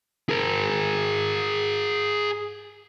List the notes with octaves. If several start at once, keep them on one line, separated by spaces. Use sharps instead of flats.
G#4 A#4